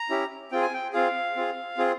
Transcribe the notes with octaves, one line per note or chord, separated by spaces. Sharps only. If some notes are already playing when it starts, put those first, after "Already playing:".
Already playing: A#5
C#4 E4 G4
C4 F4 G#4 G5
G#5
G5
C4 F4 G#4 F5
C4 F4 G#4
C4 F4 G#4